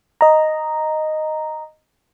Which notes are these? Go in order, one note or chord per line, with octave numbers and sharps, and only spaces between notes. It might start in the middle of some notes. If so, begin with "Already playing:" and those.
D#5 A#5